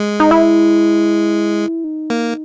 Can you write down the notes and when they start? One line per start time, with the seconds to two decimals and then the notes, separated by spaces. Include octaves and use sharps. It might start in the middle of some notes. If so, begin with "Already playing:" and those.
Already playing: G#3
0.20 D#4
0.31 E4
1.84 D#4
2.10 A#3